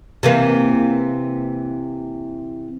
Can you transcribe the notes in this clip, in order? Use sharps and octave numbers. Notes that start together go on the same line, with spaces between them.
C3 E3 A#3